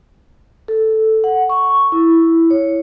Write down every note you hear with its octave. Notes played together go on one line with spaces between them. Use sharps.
A4
F#5
C#6
E4
C#5